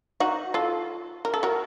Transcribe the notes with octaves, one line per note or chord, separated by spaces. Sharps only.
D#4 F#4
F4 A4
A#4
A4
F#4 A#4